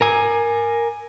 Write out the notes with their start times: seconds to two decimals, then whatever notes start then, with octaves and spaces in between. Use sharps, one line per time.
0.01 A#4 G#5